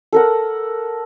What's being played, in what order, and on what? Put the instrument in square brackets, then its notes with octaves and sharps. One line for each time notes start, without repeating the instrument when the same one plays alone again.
[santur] A4 A#4 F#5